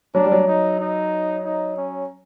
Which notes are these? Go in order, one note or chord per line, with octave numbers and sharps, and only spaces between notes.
F#3 D4
G3
F#3
D#4
D#4
D#4
C#4